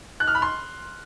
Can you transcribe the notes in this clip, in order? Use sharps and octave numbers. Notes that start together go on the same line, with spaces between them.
F#6
F6
B5
C6